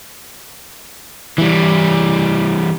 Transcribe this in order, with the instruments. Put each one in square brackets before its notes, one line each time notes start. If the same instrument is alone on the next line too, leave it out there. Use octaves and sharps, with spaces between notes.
[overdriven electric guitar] E3 G3